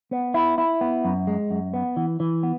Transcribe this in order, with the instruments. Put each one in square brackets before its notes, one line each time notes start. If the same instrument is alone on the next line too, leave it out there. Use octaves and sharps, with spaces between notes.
[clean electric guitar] B3
E4
E4
B3
F#2
G#3
F#2
B3
E3
E3
B3